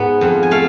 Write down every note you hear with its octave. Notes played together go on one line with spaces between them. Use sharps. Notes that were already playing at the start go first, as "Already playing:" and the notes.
Already playing: G#2 B3
F2
G#5
A3 F5